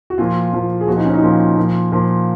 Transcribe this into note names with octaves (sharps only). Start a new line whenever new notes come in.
F#4
A#2 F3 F4
A#2 F3
G#4
A#2 F3 F#4
D#4
C#4
D#4
A#2 F3
A#2 F3
A#2 F3